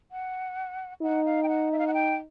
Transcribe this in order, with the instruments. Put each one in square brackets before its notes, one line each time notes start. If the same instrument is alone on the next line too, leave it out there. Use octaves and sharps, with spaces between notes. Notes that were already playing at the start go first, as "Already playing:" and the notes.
[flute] F#5
[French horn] D#4 [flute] F#5
[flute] F5
G5
F#5
E5
F5
F#5
G5